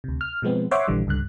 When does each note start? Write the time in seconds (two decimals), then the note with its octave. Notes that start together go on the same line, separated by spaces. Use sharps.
0.04 D2 C3
0.21 F6
0.42 B2 F3 G#3 B3 C4
0.71 C5 C#5 E5 F#5 C6 D6
0.88 A#1 D3 E3 G3
1.07 C#2 G2 D3 F#6